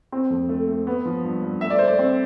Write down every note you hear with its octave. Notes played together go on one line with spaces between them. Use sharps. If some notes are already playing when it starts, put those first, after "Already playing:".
C4
F2
A3
A3
B3
F3
G2
G2
A3 E5
D5
A3 C5
D5
C4